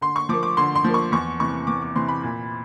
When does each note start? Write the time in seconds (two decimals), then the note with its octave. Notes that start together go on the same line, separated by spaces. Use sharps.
0.01 D3 C6
0.16 C#6
0.29 F3 A#3 D6
0.43 D6
0.57 D3 C6
0.75 C6
0.84 F3 A#3
0.94 C#6
1.12 E2 C#6
1.40 C3 E3 C#6
1.67 E2 D6
1.82 D6
1.95 C3 E3 C6
2.08 B5
2.23 A#2